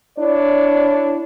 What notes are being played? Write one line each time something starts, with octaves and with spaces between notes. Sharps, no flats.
D4 E4 C#5 D5